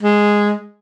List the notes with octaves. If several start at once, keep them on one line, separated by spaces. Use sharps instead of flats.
G#3